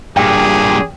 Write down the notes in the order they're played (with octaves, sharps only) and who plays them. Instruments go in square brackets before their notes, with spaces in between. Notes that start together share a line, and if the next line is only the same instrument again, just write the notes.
[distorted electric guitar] G2 A#2 [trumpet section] G4 G#4 [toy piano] G5